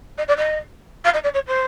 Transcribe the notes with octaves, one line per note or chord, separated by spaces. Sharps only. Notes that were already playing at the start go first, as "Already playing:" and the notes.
D#5
D5
D#5
F5
D#5
D5
C#5
C5